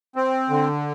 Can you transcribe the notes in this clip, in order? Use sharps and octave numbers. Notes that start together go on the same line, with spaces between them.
C4
D3